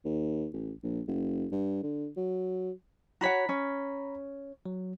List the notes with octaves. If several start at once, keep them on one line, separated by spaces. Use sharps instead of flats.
D#2
A1
A#1
F#1
G2
D3
F#3
F#4 C#5 F#5 A#5 B5 B6
C#4
F#3